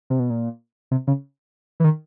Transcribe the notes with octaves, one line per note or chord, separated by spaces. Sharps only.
C3
B2
A#2
C3
C#3
E3
D#3